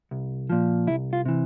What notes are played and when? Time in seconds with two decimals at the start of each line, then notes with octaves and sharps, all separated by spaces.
0.11 C2
0.50 A#2 F3
0.87 C2 E4
1.13 F4
1.25 C3 E3